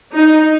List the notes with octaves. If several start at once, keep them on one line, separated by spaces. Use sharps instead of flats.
D#4